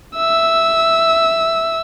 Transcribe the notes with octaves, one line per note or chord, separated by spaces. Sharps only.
E5 E6